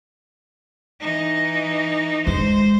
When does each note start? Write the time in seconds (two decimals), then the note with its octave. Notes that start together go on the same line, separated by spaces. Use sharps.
1.01 E3 D#4
2.27 G#3 C5